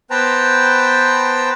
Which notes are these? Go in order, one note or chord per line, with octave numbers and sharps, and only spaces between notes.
B3 B4 C5 G5 A5 A#5